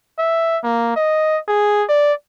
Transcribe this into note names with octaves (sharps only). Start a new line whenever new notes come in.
E5
A#3
D#5
G#4
D5